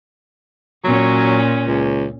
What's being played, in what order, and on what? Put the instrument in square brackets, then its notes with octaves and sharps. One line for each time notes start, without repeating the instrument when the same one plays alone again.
[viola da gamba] A#2 C#4 [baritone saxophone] F#3
[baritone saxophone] C#2